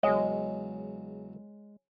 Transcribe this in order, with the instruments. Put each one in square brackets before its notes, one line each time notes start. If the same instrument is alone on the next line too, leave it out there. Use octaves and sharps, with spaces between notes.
[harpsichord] E2 C#3 F#3 [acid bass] G#3 [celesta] C#5 G#5 [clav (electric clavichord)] D#5